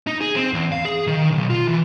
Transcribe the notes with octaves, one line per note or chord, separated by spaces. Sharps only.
D#4
G#4
C4
E2
F5
G#4
D#3
B1
F4
E3